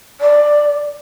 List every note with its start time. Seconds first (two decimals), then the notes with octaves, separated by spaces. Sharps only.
0.20 D5